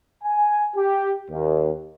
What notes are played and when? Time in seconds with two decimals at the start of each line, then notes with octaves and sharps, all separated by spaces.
0.24 G#5
0.75 G4
1.31 D#2